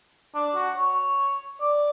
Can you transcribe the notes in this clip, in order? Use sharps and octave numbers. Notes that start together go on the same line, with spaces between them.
D4
F#4
C#5
D5